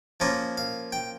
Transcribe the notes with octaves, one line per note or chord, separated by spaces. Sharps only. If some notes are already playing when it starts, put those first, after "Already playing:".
F3 A#3 C#4 F4 A#4
F5
G5